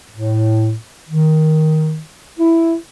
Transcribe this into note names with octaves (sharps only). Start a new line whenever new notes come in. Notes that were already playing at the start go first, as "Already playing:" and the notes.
A2
D#3
E4